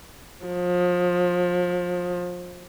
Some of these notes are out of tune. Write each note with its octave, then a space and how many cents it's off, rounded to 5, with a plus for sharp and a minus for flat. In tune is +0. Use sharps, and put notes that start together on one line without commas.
F3 +30